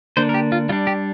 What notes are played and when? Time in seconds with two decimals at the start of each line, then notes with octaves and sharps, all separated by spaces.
0.17 D3 A#3 D4 C5
0.29 A#4
0.34 G4
0.52 F4
0.69 G3 F4
0.72 D4
0.87 G4